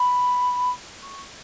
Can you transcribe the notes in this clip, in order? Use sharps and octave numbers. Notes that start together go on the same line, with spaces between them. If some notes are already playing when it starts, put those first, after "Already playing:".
Already playing: B5
C#6